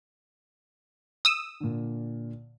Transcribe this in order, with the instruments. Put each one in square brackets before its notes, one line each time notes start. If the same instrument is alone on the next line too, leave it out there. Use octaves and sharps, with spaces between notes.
[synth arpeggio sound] D#6 E6
[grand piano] A#2 D3